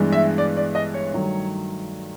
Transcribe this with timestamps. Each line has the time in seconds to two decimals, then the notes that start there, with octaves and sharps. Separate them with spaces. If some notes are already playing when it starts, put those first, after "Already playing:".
Already playing: G2 E3 G#3 B3 D4
0.12 E5
0.38 D5
0.57 D5
0.75 D#5
0.94 C#5
1.13 G2 D#3 F#3 A3